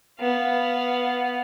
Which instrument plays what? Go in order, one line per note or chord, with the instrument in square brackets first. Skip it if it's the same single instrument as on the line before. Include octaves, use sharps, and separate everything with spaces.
[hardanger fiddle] B3 F5